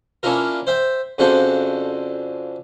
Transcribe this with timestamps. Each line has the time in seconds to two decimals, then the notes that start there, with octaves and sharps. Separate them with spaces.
0.23 A#3 C#4 D4 E4 F4 A#4
0.67 C5 E5 G5
1.18 F2 C#3 D4 F#4 A4 C5